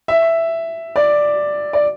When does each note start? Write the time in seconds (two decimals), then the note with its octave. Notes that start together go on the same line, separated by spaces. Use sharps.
0.08 E5
0.96 D5
1.73 D5